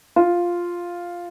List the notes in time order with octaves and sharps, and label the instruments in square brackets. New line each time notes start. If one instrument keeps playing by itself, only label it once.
[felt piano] F4